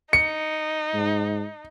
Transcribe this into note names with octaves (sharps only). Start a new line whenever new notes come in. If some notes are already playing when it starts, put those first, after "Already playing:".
D#4 C#7
G#2